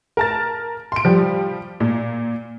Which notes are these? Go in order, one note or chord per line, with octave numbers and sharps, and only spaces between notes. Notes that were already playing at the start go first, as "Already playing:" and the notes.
A#4 A5 A6
C6 D7
F3 G3 G4
A#2